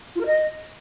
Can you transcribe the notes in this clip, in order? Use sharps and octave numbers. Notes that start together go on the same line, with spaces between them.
F4
A#4
D#5